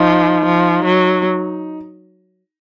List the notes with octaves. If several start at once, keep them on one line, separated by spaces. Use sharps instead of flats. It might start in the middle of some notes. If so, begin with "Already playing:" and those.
Already playing: F3 D#4
F3
F#3